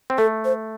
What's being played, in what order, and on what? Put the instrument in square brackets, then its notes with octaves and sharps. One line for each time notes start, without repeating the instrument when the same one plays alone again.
[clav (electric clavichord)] C4
[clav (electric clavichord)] A3 [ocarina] A4
[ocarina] C5